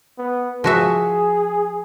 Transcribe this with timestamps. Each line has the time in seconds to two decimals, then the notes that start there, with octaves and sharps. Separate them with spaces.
0.18 B3
0.64 F3 F#4 G#4 E5